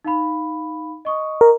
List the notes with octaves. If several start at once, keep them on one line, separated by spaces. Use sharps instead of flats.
D#4 F5 B5
D#5 C#6 D#6
A#4